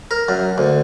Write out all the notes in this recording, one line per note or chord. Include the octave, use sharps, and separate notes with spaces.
A#4
F#2
D2